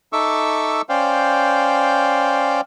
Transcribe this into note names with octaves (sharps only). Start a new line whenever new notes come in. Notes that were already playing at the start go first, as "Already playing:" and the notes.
D#4 A4 E5 C#6 D6 E6
C#4 C5 D5 F5 G5